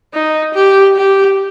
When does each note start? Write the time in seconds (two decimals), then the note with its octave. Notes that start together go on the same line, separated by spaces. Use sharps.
0.14 D#4
0.54 G4
0.96 G4